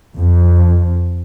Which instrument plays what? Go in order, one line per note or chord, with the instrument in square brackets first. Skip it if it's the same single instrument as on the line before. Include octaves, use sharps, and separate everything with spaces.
[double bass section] F2